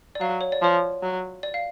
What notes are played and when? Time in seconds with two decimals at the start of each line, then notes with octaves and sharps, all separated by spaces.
0.15 D5
0.20 F#3 F5
0.41 C#5
0.52 D5
0.61 F3 C#5
1.03 F#3
1.43 D5
1.54 F5